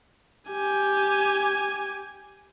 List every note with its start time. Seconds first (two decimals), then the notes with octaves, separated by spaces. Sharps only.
0.50 G4 G#5